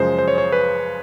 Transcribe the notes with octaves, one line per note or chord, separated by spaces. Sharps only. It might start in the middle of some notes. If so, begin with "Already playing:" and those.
Already playing: F#2 C#3 F3 G#3 C5
C5
C#5
C#5
B4